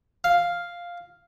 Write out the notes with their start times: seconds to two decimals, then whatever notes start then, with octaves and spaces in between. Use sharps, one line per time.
0.24 F5